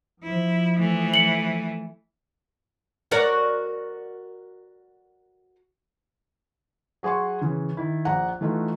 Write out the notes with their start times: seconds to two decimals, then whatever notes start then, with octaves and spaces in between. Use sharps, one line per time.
0.24 F3 E4
0.78 E3 A3
1.14 C#7 F#7
3.11 F#4 A#4 D5
7.03 F#3 G#4 F#5 C6 C#6
7.41 C#3 E3
7.77 D#3 E4
8.05 A#1 F#5 A#5
8.41 E3 A3 D#4 F4 F#4